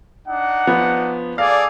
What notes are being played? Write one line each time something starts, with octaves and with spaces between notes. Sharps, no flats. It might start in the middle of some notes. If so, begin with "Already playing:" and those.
D4 D#4 F#5
F3 B3
G#4 A4 D5 F5